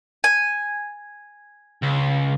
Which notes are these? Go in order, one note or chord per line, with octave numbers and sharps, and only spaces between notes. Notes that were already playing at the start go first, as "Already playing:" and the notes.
G#5
C#2